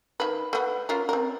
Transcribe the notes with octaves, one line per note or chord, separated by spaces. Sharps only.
D#3 B4
A3 B3
C#4 F4 A#4
C4 A#4